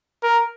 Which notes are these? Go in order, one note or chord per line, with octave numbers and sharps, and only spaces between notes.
A#4